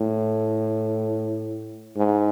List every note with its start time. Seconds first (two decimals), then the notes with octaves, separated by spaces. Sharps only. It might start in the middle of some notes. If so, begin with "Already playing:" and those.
Already playing: A2
1.96 G#2